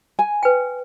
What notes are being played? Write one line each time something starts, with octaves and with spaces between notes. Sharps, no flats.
G#5
B4 G5